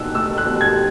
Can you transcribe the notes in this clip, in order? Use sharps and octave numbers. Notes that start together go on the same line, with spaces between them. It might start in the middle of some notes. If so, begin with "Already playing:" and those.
Already playing: B2 D#4 E6 F#6
A3 E6
F#6
B2
G#6